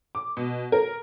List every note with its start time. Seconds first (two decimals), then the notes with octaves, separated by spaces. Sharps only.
0.15 D6
0.37 B2
0.72 A#4